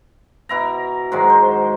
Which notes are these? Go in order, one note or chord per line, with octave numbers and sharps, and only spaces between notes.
B2 E4 A#5
G#2 D#3 F#3 G#3
C5